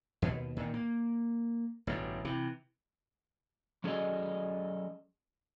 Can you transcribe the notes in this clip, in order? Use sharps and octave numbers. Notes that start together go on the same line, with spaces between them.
D#2 B2
A#2 D#3
A#3
A1 G2 B2
C3 E3
F#3 C#4 G#4 A4 D5 D#5